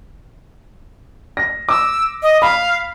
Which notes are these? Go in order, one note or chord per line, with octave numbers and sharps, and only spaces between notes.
A#6
D6 E6
D#5
F5 B5